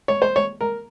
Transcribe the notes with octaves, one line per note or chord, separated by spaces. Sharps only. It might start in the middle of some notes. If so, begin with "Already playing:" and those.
C#5
C5
C#5
A#4